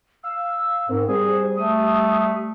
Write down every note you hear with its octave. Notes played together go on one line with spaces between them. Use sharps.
F5 E6
G#2 C4 A#4
G3 G#4 C5
A3 D#6